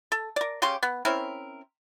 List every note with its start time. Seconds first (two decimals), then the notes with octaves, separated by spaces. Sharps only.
0.12 A4
0.36 A#4 D5
0.62 C#3 C#4 G4 C6
0.83 B3
1.05 C4 C#4 E4 A#4